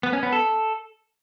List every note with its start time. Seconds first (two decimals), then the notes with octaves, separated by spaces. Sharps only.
0.03 B3
0.13 C#4
0.23 B3
0.33 A4